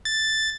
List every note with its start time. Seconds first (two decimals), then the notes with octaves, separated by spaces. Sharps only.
0.05 A6